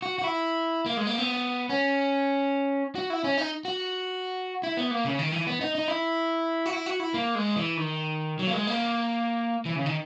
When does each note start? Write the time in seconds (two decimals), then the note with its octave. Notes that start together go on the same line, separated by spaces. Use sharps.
0.02 F#4
0.18 F#4
0.24 E4
0.86 A#3
0.97 G#3
1.07 A#3
1.18 B3
1.70 C#4
2.95 F#4
3.10 E4
3.24 C#4
3.37 D#4
3.65 F#4
4.63 E4
4.77 B3
4.91 A#3
5.05 C#3
5.19 D#3
5.32 E3
5.47 B3
5.61 D#4
5.75 D#4
5.88 E4
6.66 F#4
6.73 E4
6.86 F#4
7.00 E4
7.14 A#3
7.35 G#3
7.56 E3
7.77 D#3
8.39 F#3
8.47 A#3
8.53 G#3
8.67 A#3
9.66 E3
9.76 C#3
9.86 D#3